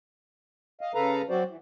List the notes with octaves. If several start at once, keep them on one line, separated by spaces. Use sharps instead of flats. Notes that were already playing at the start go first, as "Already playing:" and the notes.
D#5 F5
C#3 A4 B4 F5 A#5
F#3 C4 F#4 C5 D5
E3